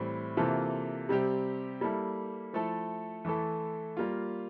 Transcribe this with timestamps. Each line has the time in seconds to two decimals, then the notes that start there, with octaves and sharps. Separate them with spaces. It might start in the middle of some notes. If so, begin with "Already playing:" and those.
Already playing: A2 E3 G3 C4 E4
0.37 C3 E3 A#3 F4 A4
1.09 C3 G3 C4 G4
1.81 G3 A#3 E4 A4
2.53 F3 A3 E4 A4
3.25 E3 A3 E4 A4
3.97 G3 A#3 F4